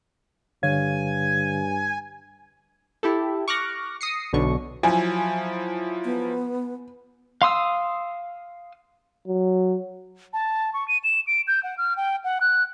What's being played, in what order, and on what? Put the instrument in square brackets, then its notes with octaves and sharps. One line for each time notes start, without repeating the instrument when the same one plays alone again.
[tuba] G2 [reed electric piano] D3 C#5 F5 [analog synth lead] G#5
[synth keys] E4 G4 A4
C#6 D6 F6 F#6 A#6
D#6 A#6 C7 C#7
B1 B2 D3 C#6
[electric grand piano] F3 F#3 E4 [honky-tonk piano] G#5
[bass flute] B3
[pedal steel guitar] F5 C6 D#6 E6
[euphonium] F#3
[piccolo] A5
C#6
D#7
E7
D7
G6
F#5
F6
G5
F#5
F#6